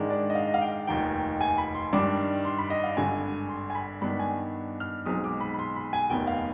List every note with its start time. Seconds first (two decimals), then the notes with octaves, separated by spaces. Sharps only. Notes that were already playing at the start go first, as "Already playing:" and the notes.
Already playing: G#2 D#3 G#3 D4
0.10 D5
0.30 D#5
0.35 F5
0.47 D#5
0.54 F5
0.62 G5
0.87 F1 D#2 D#3 G5
1.41 G#5
1.58 B5
1.74 C6
1.93 G2 D#3 G3 D4 D6
2.45 C6
2.58 B5
2.70 D#5
2.84 F5
2.97 G#1 G2 D3 G#5
3.49 C6
3.70 G#5
3.75 B5
4.02 G2 D#3 B3 D4 B5
4.19 G#5
4.80 F6
5.06 B1 B2 G#3 C4 D#4 D#6
5.24 D6
5.40 B5
5.54 B5
5.59 C6
5.76 B5
5.93 G#5
6.10 F1 D#2 D#3 B3 G5
6.27 F5